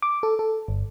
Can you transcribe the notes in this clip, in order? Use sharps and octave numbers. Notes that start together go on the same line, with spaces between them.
D6
A4
A4
G1